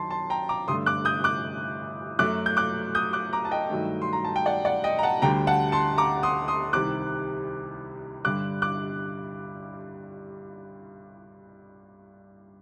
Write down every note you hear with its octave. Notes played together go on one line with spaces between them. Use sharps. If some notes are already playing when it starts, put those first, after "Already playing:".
Already playing: F#2 D#3 F#3 A5 C6
A5 C6
G5 A#5
A#5 D6
G2 D3 A3 C6 D#6
D6 F#6
D#6 G6
D6 F#6
F#2 F#3 A3 D6 F#6
G6
D6 F#6
D#6 G6
D6 F#6
A#5 D6
A5
D#5 G5
G2 D#3 F#3 A3
C6
A#5
A5
G5
D5 F#5
D5 F#5
D#5 G5
A#5
F#5 A5
D2 D3 G3 G5 A#5
F#5 A5
A5 C6
A#5 D6
C6 D#6
C6 D#6
C2 C3 D#3 G3 D6 F#6
G2 D3 G3 D6 F#6
D6 F#6